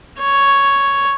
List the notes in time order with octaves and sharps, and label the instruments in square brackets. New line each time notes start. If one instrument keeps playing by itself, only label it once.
[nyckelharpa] C#5